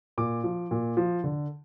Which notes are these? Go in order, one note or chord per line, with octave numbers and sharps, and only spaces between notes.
A#2 D6
F3
A#2
F3
D3